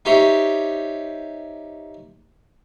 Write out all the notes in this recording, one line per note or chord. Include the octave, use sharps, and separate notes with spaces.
D#4 G4 C5 C#5 E5